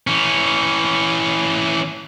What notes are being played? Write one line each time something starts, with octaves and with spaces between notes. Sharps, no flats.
E3 C#4